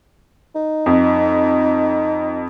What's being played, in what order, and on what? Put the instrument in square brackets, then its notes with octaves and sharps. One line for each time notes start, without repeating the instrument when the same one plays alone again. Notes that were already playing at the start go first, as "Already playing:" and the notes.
[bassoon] D#4
[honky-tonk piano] F2